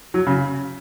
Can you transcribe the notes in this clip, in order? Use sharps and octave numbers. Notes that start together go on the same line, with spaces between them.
F#3
C#3